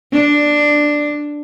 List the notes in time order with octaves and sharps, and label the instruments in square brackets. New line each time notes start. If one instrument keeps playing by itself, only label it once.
[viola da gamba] D4